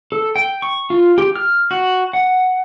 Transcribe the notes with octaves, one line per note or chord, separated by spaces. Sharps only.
A4
G5
C#6
F4
G4
F6
F#4
F#5